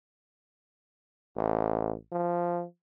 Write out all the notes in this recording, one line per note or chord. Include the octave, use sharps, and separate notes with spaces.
A1
F3